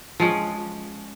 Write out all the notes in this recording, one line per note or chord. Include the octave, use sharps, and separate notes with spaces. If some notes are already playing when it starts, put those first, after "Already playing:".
F3 G#3 C#4